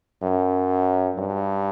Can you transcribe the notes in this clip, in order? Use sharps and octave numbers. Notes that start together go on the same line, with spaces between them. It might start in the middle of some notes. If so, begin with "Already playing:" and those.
F#2
G2